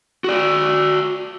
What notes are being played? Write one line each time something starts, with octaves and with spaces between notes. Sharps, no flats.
F#4 D5